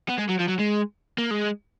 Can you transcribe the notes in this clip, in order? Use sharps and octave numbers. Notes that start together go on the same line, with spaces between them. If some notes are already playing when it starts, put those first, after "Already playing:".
B3
G#3
F#3
F3
F#3
G#3
A#3
G#3